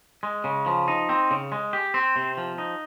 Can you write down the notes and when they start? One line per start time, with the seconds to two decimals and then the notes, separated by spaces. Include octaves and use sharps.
0.23 G#3
0.44 C#3
0.66 F3
0.88 D#4
1.09 C4
1.31 C#3
1.52 G#3
1.73 G4
1.94 C4
2.16 C3
2.37 F3
2.58 D#4